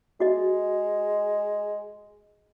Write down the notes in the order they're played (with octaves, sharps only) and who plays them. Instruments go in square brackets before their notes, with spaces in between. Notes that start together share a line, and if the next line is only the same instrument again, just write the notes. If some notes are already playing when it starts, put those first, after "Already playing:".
[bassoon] G#3 [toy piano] F#4 D#5